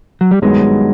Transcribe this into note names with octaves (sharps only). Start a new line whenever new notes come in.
F#3
G3
G2 D#3 F#3 G#3 B3